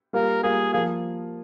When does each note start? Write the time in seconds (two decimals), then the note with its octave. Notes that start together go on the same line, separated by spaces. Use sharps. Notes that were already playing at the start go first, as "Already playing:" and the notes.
0.13 G3 A#3 F4 A#4
0.43 G3 A#3 F4 G#4
0.73 F3 A#3 F4 G#4